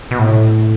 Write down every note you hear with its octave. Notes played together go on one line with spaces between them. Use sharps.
B2
A2